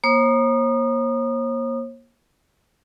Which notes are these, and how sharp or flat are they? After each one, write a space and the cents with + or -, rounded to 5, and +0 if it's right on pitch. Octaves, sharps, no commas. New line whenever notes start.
A#3 +25 C#5 -45 D#6 -30